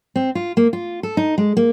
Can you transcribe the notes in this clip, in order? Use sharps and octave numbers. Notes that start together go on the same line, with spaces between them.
C4
F4
A#3
F4
A4
D#4
G#3
A#3